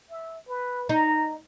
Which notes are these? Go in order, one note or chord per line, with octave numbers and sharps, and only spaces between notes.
E5
B4
D#4 A#5